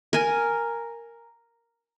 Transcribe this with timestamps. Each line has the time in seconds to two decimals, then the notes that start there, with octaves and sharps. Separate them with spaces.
0.13 A#4 G#5